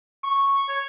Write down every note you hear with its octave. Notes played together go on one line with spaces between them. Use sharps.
C#6
C#5